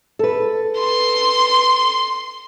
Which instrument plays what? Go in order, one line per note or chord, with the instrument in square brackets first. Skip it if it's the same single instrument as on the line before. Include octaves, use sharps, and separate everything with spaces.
[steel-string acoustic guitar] A4 B4
[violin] C6